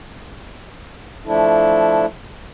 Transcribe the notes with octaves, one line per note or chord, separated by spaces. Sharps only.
F3 A3 D4 E4 A4